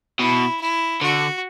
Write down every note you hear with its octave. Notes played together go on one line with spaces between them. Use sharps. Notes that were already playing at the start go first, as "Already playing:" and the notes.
B2 E4
E4
D3 F#4